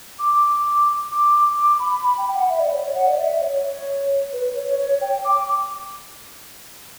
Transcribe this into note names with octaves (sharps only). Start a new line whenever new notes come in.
D6
D6
D6
B5
B5
G5
F#5
E5
D5
C#5
C#5
F#5
D5
E5
C#5
B4
C#5
C#5
G5
D6